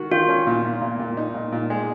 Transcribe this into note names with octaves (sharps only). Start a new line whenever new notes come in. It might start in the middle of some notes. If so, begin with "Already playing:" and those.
Already playing: D#3 F#4
D#3 F4
C#4
A#2
A#2
A#2
A#2
D#4
A#2
A#2
G#3